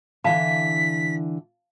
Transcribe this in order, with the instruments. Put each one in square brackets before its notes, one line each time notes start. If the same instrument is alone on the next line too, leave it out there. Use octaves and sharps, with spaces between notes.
[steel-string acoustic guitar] D3 E3 [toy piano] F5 A5 B5 [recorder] B6